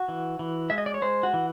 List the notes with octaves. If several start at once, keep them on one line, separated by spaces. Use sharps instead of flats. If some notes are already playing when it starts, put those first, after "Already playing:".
Already playing: F#4
E3
E3
G#3 E5
D#5
D5
C#5
G#3 C5
F#4
E3